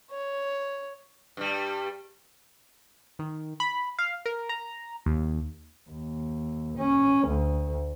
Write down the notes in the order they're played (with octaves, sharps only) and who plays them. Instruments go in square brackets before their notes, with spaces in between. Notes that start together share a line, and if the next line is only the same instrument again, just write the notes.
[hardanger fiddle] C#5
[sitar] G2 G3
[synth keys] D#3
B5
F5
A#4
A#5
D#2
[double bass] D#2
C#4
D2